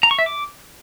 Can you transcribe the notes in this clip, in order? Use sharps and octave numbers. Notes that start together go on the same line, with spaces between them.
A#5
C#6
E5
D6